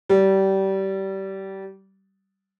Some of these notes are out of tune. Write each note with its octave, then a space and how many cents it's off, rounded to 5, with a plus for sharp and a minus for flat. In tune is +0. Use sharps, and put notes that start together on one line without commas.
G3 -25